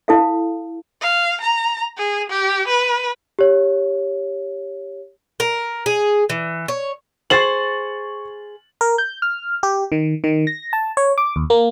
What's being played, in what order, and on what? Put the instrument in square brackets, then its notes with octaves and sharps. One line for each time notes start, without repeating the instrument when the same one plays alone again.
[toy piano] E4 A4 F5
[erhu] F5
A#5
G#4
G4
B4
[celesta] G4 C#5
[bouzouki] A#4
G#4
E3
C#5
[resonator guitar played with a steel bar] G#4 C5 [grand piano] C#6 A6 F#7
[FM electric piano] A#4
G6
F6
G4
D#3
D#3
A#6
A5
C#5
D6
D#2
A#3